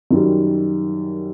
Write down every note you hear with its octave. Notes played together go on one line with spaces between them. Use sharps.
F#2 D#3 G3